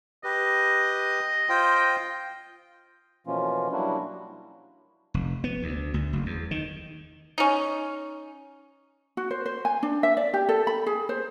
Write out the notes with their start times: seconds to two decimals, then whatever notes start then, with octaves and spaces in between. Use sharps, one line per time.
0.24 G4 B4 D#5
1.49 F4 C5 G5
3.27 B2 E3 F3 A#3 C#4 F4
3.72 F#3 G3 A#3 D4 E4 F#4
5.14 F1
5.44 B3
5.63 D2
5.94 D2
6.13 F#1
6.26 E2
6.51 D#3
7.38 C#4 D#4
9.17 F#4
9.31 C5
9.46 C5
9.65 G#5
9.83 D4
10.03 E5
10.17 D5
10.34 G4
10.49 A4
10.67 B5
10.86 G#4
11.09 C5